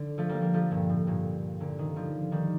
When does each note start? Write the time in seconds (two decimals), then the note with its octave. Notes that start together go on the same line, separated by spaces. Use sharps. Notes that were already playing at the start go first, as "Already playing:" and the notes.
Already playing: D3
0.18 F3 A3
0.29 G3 A#3
0.41 G3 A#3
0.54 F3 A3
0.71 G2 A#2
0.89 A2
1.07 G2 A#2
1.60 A#2 D3
1.78 C3 D#3
1.96 D3 F3
2.32 D#3 G3